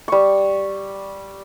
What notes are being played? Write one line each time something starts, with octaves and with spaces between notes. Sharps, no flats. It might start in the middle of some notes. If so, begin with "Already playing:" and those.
G3 C#6